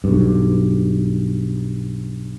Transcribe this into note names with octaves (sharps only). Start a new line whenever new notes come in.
B1 G2